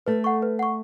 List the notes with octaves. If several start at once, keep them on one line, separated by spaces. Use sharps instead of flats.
A3 B4
F#5 C#6
B4
F#5 C#6